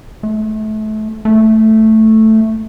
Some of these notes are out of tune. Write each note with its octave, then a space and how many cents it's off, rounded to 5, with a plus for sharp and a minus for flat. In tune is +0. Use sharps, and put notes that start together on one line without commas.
A3 -30
A3 +0